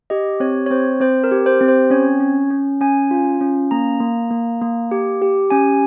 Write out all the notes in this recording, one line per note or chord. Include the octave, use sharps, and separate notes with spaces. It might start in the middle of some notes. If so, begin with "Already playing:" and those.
G4 D#5
C4 C#5
C#5
C4 C5
C4 C5
A#4
G4
C5
C4
C5
C#4 C#5
C#4
C#4
C#4 G#5
F4
C#4
A#3 A#5
A#3
A#3
A#3
G4
G4
C#4 G#5